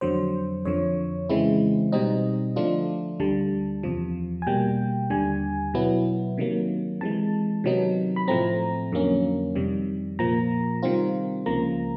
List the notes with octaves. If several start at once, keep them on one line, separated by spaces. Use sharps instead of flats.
F2 D3 F#3 C5
F2 D3 F3 C#5
C#3 E3 G#3 C4 E4
B2 G3 C4 D#4 D#5
D3 F3 A3 D4 F4
D2 D3 G3 A5
E2 C3 F3
G#5
B2 G3 A#3 G5
D#2 D3 G3 G#5
B2 F#3 B3 E4
C3 D#3 F#3 A#3
C3 E3 G#3 A5
C3 D#3 F#3 B3 D#4
B5
A2 F3 A3 C4 A#5
F2 D3 F#3 A#3 C#4
F2 C3 D#3 G3
A#2 F3 A#3 A#5
C3 D#3 G3 C4 F4
C#2 C#3 F3 A#3 A#5